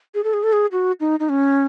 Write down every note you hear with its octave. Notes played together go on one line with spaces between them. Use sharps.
G#4
A4
G#4
A4
G#4
F#4
D#4
D#4
C#4